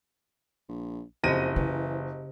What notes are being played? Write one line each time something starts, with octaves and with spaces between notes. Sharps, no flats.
A#1
F#1 F2 G4 C5 D#5 A#6 D#7
C#3 E3